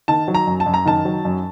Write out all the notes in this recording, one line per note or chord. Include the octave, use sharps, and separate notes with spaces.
D#3 A5
F#3
A#5
F#2
A5
F#2
A#5
D#3 A5
F#3
F#2